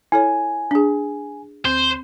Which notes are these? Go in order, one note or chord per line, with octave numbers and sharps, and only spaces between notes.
E4 A4 C#5 G#5
D4 G#4
D2 C4 C5